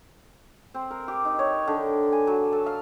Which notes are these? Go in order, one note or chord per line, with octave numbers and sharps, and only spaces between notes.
C4
A#4
G4
D#4
C#5
D3
G#5
F#3
A4
F5